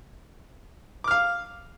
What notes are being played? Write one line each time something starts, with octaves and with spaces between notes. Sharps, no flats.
F5 D6 F6